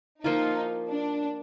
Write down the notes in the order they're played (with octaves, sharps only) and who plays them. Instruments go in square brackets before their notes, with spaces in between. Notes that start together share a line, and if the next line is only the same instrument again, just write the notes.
[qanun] F3 A#3 F4 [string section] D#4
[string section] D4